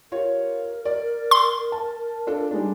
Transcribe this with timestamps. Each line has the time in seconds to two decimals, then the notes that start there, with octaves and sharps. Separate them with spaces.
0.12 F4 G4 A#4 C#5
0.85 D5
1.31 C6
1.72 A5
2.27 D4 F4 A4
2.51 G3 G#3 D4 D#4